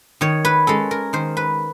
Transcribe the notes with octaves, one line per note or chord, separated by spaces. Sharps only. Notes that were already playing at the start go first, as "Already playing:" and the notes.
D#3 C#5
B4
G#3 C#4 A4
A#4
D#3 C5
B4